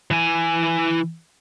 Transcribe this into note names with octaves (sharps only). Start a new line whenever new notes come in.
E3 G#5